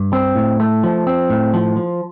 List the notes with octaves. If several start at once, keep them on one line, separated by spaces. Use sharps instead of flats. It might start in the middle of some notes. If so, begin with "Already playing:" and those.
Already playing: G2
C4
A2
A3
F3
C4
A2
F3
F3